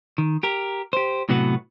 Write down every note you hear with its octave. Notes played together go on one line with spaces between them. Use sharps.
D#3
G4 A#4
G4 C5
A2 C3 F#3 B3 F#4 B4